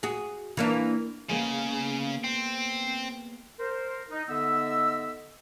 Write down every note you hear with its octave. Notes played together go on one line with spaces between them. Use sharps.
F#4 G#4
E3 A#3 D4
C#3 G#3 A#3 B3
C4
A#4 C5
D#4
D3 B3 D#4 D#5 E5 E6